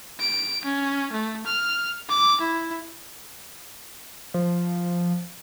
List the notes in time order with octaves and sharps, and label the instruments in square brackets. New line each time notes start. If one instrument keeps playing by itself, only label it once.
[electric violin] D7
C#4
A3
F6
D6
E4
[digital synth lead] F3